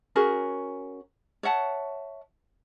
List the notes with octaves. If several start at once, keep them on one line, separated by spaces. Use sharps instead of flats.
C#4 F#4 G#4 A#4
C#5 E5 F#5 A5